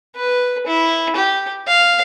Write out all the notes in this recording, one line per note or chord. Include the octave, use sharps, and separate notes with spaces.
B4
E4
G4
F5